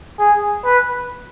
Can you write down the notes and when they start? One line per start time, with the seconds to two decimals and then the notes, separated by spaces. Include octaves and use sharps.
0.20 G#4
0.65 B4